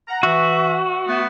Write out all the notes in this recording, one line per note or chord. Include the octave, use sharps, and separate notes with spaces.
F#5 A#5
E3 F#4 E5
A3 B3